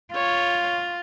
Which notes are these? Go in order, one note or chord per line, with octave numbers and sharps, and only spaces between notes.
F4 C#5